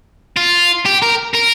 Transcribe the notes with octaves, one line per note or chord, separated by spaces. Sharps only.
F4
G4
A#4
A#4